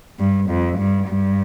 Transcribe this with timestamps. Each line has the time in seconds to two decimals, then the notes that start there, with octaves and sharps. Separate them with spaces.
0.19 G2
0.49 F2
0.78 G2
1.07 G2